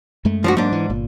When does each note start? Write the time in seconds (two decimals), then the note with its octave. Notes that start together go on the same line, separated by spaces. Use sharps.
0.25 F#2 G#3 A3
0.44 F3 D4 F#4
0.57 G#2 F#3 A#3 D4
0.72 E3
0.90 G1 A#2